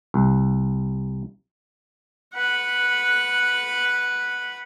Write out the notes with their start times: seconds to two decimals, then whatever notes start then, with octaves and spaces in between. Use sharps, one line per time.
0.14 C2
2.34 B4 F#5